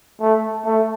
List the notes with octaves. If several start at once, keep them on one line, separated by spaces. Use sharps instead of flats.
A3
A3